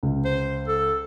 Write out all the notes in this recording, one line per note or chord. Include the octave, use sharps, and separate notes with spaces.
C#2
C5
A4